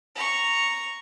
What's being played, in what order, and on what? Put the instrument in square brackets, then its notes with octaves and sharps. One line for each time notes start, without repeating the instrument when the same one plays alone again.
[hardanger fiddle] A#5 C#6